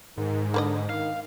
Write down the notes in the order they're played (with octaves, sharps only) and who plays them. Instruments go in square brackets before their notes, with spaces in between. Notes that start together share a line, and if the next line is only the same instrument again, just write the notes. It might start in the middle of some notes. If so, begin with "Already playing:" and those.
[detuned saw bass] G#2 [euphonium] D#3
[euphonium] D3 [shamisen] A#3 B4 D#5
[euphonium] D#3 [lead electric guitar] F5